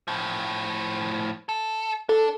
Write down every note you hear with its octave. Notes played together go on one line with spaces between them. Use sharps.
A2 F3
A4
D4 A4